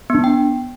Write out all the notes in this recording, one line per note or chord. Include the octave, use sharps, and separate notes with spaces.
B3 D4
G5